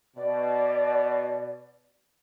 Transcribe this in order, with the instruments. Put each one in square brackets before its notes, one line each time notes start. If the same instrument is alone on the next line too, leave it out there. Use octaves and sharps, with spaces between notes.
[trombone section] B2 [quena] D5